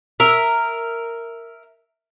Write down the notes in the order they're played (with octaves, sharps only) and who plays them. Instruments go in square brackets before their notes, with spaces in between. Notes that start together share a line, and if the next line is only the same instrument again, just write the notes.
[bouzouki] A#4 E5